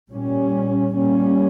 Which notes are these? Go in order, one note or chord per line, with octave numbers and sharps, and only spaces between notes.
A#2 G3 C#4
A#2 G3 A#3 C#4